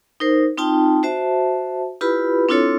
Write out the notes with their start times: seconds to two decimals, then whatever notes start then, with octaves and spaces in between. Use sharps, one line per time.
0.20 D#4 A#4 C5
0.58 C4 D#4 F4 G5 A5
1.03 F#4 C5 E5 A5
2.01 E4 F4 G4 B4 B5
2.49 C4 D4 E4 F4 A4 C#5